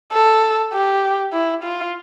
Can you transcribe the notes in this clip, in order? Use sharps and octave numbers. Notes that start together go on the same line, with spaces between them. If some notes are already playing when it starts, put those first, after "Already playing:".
A4
G4
E4
F4